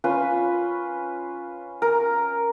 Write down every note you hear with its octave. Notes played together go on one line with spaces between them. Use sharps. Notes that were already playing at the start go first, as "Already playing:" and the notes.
C#4 F4 B4
A#4